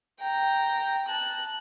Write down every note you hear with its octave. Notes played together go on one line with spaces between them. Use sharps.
G5 A#5
A5 F#6